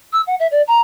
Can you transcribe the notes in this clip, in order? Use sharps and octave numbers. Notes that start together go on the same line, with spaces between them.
E6
F#5
E5
D5
A#5